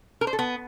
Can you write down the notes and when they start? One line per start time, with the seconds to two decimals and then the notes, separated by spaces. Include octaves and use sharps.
0.21 A#4
0.27 C5
0.33 A4
0.39 B3